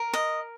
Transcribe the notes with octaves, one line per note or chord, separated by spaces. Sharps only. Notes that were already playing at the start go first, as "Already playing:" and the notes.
Already playing: A#4
D#5